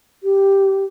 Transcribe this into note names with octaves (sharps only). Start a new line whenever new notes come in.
G4